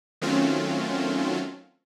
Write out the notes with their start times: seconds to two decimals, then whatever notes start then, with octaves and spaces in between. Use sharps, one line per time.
0.22 D#3 F#3 A3 C4 C#4 F4